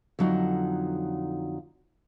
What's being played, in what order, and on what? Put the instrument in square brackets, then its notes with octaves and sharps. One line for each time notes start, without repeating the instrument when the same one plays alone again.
[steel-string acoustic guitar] F2 D3 F#3 D#4 F#5